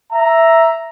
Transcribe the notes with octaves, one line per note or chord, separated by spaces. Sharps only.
E5 A#5